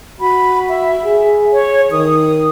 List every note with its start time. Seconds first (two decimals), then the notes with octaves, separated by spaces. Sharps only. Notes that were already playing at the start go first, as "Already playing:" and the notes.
0.21 F#4 B5
0.69 E5
1.05 G#4
1.53 C#5
1.91 D#3 D#6